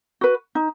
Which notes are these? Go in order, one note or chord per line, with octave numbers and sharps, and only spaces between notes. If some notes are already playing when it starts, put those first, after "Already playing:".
F#4 B4
D#4